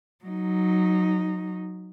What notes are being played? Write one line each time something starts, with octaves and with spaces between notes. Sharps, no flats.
F#3 D#4